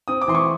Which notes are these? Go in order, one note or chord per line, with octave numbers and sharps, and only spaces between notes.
C4 D#6
D6
E3 C6
C#6